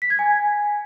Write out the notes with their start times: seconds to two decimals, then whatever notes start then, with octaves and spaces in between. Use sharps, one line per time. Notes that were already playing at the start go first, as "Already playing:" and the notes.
0.02 B6
0.10 G#6
0.19 G#5